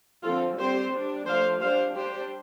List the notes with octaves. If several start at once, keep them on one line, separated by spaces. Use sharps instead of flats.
D3 F3 C4 F4 A4
G3 C4 G4 C5
G3 D4
F3 A3 D4 C5 F5
G3 D4 C5 F5
G3 D4 G4 C5